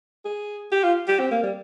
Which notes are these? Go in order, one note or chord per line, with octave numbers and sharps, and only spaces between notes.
G#4
G4
F4
G4
C4
A#3
G3